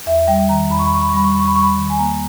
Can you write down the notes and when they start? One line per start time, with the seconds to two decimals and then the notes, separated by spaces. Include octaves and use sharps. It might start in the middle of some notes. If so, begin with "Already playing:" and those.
0.06 E2 E5
0.28 G3 G5
0.49 D#3 A#5
0.70 E2 B5
0.79 C#6
0.86 B5
0.92 E2 C#6
1.01 B5
1.09 C#6
1.13 G3 B5
1.24 C#6
1.32 B5
1.35 E2 C#6
1.47 B5
1.55 G3 C#6
1.63 B5
1.78 D#3
1.90 G#5
1.99 A#3 A#5